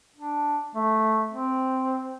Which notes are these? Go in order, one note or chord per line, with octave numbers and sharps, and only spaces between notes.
D4
A3
C4